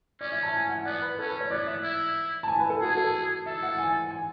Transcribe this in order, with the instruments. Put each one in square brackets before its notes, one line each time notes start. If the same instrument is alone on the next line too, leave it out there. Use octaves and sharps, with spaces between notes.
[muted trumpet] C#4 [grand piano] D5
[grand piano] E5
A5
G#5
F#5
[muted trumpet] B3 [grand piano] D5
[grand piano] B4
[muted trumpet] C#4 [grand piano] A4
[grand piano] B4
C#5
[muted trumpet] B3 [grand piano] D5
[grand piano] D5
E5
[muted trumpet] E4
[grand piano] A5
G#5
B4
A4
[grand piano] F#4 [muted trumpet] G#4
[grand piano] A4
[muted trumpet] A4 [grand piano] E5
[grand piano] F#5
G#5
G#5